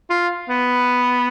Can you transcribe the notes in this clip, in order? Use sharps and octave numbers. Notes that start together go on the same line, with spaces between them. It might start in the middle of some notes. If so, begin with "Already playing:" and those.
F4
B3